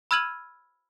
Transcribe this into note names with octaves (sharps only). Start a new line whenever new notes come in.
B5 E6 F6 G#6 D#7 F#7